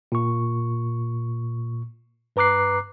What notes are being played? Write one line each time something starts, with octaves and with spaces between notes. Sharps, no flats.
A#2 C#6
G2 B4 A#5 D6 F#6 C7